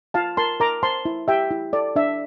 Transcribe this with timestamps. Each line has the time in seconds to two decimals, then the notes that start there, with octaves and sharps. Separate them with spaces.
0.14 F4 F5 A5
0.37 A#4 A5 C6
0.60 A#4 A#5 D6
0.83 C5 A5 C6
1.05 E4
1.28 G4 E5 G5
1.51 E4
1.73 A4 D5
1.96 D4 E5